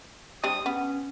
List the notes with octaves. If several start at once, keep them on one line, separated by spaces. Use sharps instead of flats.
G3 C4 D4 D#6
B3 C#4